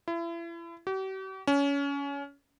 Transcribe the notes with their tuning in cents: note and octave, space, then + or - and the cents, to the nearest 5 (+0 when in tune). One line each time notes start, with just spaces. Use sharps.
E4 +35
G4 -45
C#4 +25